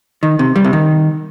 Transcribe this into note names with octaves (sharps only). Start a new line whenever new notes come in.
D#3
C3
G3
C3
D#3